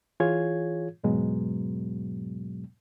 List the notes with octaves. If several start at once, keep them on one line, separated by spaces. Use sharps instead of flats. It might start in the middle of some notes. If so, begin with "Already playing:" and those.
E3 F4 G#4 C#5 G#6
E2 G#2 B2 F#3 G#3 B3